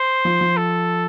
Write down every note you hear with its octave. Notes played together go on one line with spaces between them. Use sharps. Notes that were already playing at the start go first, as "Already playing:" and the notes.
Already playing: C5
F3
F3
A4